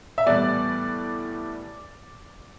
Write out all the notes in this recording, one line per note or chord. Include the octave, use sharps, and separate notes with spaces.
E5
A2 E3 G3 B3 D5